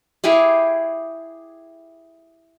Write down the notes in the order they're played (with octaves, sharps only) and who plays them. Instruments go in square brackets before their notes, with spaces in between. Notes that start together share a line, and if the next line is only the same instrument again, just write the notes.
[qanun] E4 G4 G#4 F5